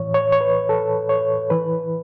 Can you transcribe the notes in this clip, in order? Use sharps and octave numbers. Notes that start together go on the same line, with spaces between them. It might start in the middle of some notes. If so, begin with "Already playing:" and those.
Already playing: A2 E3 C#5
C#5
C#5
B4
A4
C#5
E3 B4